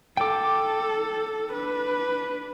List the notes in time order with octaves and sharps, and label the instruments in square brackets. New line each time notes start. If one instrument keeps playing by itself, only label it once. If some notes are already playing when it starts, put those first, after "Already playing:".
[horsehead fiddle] A4 [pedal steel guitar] G5 D6
[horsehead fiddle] D4 B4